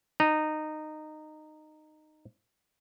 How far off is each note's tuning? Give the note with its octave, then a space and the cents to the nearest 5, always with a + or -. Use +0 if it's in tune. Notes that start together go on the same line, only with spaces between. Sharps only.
D#4 -15